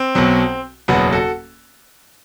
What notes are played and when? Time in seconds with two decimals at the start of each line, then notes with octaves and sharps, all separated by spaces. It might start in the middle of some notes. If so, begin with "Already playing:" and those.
Already playing: C4
0.15 B1 B2 F#3
0.88 F#1 E2 B2 F#3 B3
1.13 F#4 A4